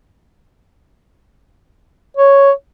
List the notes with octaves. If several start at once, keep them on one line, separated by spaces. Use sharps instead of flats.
C#5